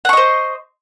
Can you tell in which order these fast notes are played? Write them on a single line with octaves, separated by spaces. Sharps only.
F#5 C#6 D#5 C5